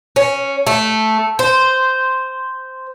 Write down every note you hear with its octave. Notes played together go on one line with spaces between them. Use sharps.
C#4
A3
C5